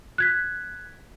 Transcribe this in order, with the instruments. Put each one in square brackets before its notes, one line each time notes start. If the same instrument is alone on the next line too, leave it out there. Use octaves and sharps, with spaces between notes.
[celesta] F#6 G#6 B6